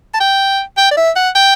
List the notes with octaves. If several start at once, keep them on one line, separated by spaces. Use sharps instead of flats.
A5
G5
G5
D5
E5
F#5
G5